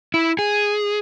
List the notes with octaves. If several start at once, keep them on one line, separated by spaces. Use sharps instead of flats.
E4
G#4